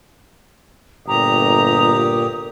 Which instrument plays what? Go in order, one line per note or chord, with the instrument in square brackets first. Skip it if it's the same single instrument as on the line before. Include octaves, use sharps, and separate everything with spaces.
[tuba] G1 [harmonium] A#2 G4 [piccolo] A#5 [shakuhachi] D#6